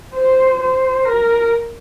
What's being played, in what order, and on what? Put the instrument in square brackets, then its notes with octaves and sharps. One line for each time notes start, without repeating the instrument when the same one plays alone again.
[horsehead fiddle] C5
C5
A#4